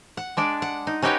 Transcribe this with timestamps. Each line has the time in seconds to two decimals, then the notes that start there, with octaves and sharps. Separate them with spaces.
0.17 F#5
0.37 G#3 D4 D5
0.62 F#5
0.87 D#4
1.02 C#4 D#4 F#4 G4 B4 C#5